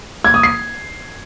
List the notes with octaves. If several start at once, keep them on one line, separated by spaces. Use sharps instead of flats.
G#6
D#6
C7